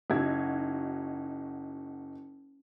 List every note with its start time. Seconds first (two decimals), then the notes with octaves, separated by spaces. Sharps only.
0.10 F#1 D#4 F#4 E6 G#6